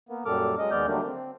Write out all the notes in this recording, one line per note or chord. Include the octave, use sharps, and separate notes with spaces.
A#3 B3
F#2 A#2 G3 A4 D6 F6
F#3 G#3 D#5
D#2 G#3 B3 D5 F6 G6
D3 F#3 G3 A3 A#3 D4
C4